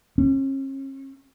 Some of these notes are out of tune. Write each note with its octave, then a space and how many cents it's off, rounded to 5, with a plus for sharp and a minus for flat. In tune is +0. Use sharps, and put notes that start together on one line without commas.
C#4 -40